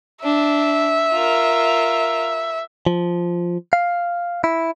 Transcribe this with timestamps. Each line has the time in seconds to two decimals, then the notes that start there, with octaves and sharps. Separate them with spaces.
0.24 D4 E5
1.12 F4 A#4
2.87 F3
3.73 F5
4.44 E4